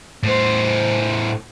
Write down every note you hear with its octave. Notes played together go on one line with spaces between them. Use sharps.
A2 C5